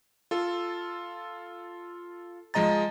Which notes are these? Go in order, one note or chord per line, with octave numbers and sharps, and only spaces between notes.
F4 A4
F3 G#3 D#5 A#5 A6